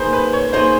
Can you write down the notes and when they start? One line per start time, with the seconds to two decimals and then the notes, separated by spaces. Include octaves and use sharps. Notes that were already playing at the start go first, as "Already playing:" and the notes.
Already playing: A#3 D#4 G#4 B4 C5
0.13 B4
0.33 C#5
0.53 A#3 D#4 G#4 C5